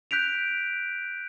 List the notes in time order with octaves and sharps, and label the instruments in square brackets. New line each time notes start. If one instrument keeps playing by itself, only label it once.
[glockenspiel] F#6 G6 B6 D7 F7